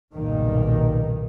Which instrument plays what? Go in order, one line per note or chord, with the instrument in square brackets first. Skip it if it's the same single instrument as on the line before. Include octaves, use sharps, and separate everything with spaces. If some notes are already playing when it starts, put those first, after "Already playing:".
[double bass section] F#1 B1 G2 A#2 D#3